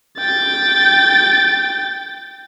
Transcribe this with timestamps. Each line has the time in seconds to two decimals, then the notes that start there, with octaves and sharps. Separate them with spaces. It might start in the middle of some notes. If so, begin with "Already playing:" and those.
0.18 G5 A6